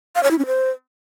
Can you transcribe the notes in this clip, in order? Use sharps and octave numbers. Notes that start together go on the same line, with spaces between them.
F5
C#5
E4
C#4
C5